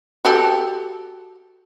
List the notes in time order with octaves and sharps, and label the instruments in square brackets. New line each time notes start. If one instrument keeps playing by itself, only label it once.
[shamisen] F#4 G4 A4